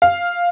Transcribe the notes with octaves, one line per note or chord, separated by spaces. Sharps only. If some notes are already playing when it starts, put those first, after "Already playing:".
F5